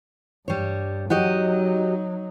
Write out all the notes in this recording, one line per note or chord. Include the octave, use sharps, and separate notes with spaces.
G2 G3 C#5
F#3 D#4 F#4 G4 D#5